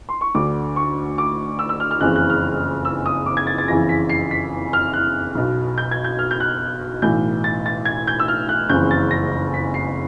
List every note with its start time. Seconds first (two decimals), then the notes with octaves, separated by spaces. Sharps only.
0.09 C6
0.21 C#6
0.35 D2 D3 D6
0.76 C#6
1.18 D6
1.59 E6
1.69 E6
1.80 F6
1.91 F6
2.01 F#1 F2 C#3 E3 F#6
2.16 F#6
2.30 F6
2.85 E6
3.06 D#6
3.26 D6
3.37 G#6
3.47 A6
3.58 A6
3.68 F#1 F2 C#3 E3 A#6
3.89 B6
4.09 C7
4.31 B6
4.73 F6
4.93 F#6
5.35 B1 B2
5.78 G6
5.91 G#6
6.04 G6
6.19 F6
6.31 G6
6.40 F#6
7.02 B1 A2 E3 G6
7.44 A6
7.66 A6
7.85 G#6
8.07 G6
8.19 E6
8.28 F6
8.49 F#6
8.69 F#1 F2 C#3 E3 G6
8.91 A6
9.11 A#6
9.54 B6
9.74 C7